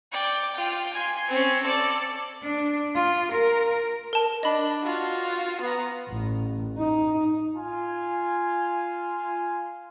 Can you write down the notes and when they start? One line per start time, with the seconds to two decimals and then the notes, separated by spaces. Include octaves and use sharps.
0.12 D5 G5
0.55 F4 G5
0.93 G#5 C6
1.28 C4 C#4
1.63 A4 D5
2.43 D4
2.95 F4
3.31 A#4
4.13 A#4 A5
4.43 D4 D#5 B5
4.82 F4 F#4
5.61 B3 A#5
6.10 A1
6.78 D#4
7.56 F4 G#5